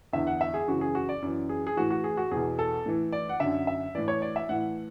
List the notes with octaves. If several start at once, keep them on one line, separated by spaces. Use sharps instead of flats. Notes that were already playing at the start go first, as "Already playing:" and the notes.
E2 D3 E5
F#5
E5
G#4
F#2 C#3 E3 F#4
G#4
F#4
D5
F#2 E3
G#4
G#4
A2 E3 F#4
F#4
G#4
F#4
E2 B2 G#4
A4
A2 E3
D5
F#5
F#2 D3 E5
E5
A2 E3 D5
C#5
D5
E5
A2 E3 F#5